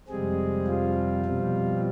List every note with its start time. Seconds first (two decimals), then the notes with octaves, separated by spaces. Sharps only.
0.08 F2 C3 G3 G#3 C4 G#4
0.67 F3 F4
1.25 B2 G3 C4